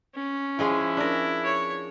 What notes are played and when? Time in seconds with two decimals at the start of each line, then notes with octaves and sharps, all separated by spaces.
0.16 C#4
0.59 F3 G#3 E4 G#4
0.97 D4 A#4
1.44 C#5